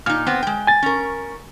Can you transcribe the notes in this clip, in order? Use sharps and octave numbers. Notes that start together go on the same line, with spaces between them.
A#2 D#4 F6
B3 C4
G#3 G5
G#5 A6
C#4 A#4